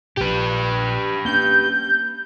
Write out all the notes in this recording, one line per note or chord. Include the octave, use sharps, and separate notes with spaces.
A#1 A#2 G4 B4
A#3 C#4 D4 G6